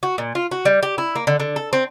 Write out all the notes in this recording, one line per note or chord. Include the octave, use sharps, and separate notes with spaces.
F#4
A#2
F4
F#4
G3
G4
E4
A#3
D3
D3
A4
C4